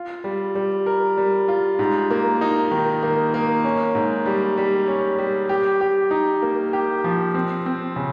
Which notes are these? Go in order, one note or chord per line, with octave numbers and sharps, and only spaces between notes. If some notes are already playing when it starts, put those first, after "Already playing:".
Already playing: F4
G3
G3
A#4
G3
F4
G#2
A#3
D#4
D#3
A#3
A#3
C#4
G#2
G3
G3
C#4
G3
G4
G4
D#4
A#3
G4
F3
C4
C4
C#3